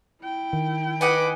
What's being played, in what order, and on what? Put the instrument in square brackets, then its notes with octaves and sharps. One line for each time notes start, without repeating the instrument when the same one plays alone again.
[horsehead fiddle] E4 G5
[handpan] D#3
[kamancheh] B4 D6 [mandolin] D#5 F#5 G#5